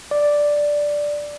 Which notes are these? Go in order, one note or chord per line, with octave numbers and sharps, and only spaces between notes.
D5